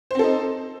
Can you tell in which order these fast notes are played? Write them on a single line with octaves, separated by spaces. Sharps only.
C5 C4 A4 D#4